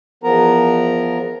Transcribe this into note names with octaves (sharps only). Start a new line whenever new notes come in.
E2 F3 B3 A#4 A#5